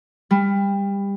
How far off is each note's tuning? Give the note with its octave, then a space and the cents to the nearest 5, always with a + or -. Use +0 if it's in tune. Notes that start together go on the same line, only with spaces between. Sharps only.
G3 +25